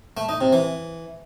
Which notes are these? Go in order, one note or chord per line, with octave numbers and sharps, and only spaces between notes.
A3
D#4
C3
E3